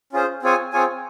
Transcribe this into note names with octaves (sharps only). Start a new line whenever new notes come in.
C#4 F4 G#4 C5
C4 F4 G#4 C#5 G#5
C4 F4 G#4 C#5 G#5